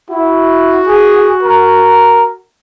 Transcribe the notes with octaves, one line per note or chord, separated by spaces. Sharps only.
E4 F#4
G#4
A#4